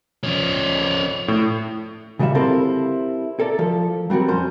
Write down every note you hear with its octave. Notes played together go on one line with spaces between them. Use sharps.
F3 C#4 C#5 D5
A2
C#3 G3 F#4 B4 E5 F5
C4 E4 G4 A4 A#4 C5
A4 A#4 D5
F3 A4
F#3 G3 C4 F#4 A#4
F2 C#4 C5 C6